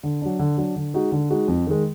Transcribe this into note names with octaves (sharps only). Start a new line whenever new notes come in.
D3
F#3 D4
D3
F#3 D4
D3
G#3 D#4 F#4
D3
G#3 D#4 F#4
F2
D#3 G#3